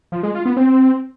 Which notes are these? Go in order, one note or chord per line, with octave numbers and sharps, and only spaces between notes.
F3
G#3
F4
B3
C4